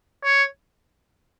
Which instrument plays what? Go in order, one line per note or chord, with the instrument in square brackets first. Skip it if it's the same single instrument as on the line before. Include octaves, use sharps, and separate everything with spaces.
[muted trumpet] C#5